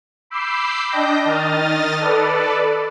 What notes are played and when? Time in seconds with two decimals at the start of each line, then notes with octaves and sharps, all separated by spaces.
0.30 B5 D6 E6 G6 C7
0.90 D4 D#5 G5 G6 A#6
1.25 D#3 D#5 D#6 F6 A6
2.00 A4 B4 D5